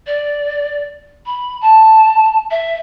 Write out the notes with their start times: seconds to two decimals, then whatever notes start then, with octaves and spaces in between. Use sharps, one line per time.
0.07 D5
1.26 B5
1.61 A5
2.51 E5